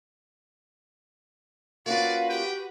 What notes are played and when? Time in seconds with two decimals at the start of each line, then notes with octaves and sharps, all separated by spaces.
1.86 A#3 C#4 F4 F#4 B4 D5 F5
2.30 G4 G5